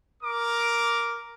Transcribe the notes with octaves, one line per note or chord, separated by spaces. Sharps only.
A#4 D6